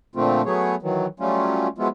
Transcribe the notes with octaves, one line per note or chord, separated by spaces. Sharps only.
A#2 D3 F3 A3 C4 F4
F#3 A3 B3 G#4 C#5
D#3 E3 F#3
F#3 G3 A3 C#4 F4
F3 F#3 G#3 B3 E4 F4